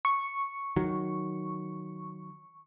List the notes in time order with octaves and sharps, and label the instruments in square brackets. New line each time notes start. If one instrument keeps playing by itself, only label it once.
[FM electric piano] C#6
[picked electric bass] D#3 F#3